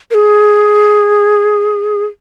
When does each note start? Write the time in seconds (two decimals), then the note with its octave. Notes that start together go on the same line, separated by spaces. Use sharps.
0.11 A#4
0.14 G#4